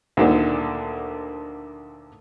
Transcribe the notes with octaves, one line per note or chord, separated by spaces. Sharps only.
D2 A#2 D3 D#3 D4